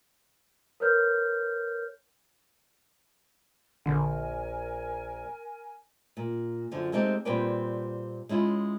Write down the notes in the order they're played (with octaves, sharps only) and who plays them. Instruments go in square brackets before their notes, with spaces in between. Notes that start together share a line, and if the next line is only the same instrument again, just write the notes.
[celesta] A#4 B4 C#5 F6 G6
[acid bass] A#1 [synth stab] D3 [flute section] A#4 G#5
[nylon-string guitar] A#2
F#2 D3 F3
G#3 A3 C4 D#4 G4
A#2 G3 C4 B4 D5 G5
G#3 C#4 E4 F4